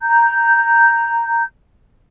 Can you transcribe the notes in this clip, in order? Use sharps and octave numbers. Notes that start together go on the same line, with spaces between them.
A#5 G6